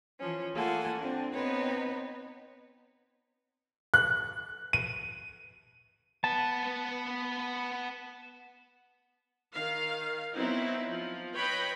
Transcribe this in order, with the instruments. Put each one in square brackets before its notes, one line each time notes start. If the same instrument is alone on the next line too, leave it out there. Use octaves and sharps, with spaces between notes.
[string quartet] E3 F3 C#4
A3 A#3 F4 A4 F#5 G#5
C4 D4
B3 C4 D#4 B4 C#5
[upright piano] F#6
D#7
[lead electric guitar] B3 B4 [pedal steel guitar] A5
[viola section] D#3 F5
F#3 B3 C4 D#4 E4
F3
B4 C#5 D#5 G5 B5